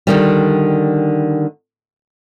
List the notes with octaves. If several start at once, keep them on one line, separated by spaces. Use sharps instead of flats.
D3 D#3 G3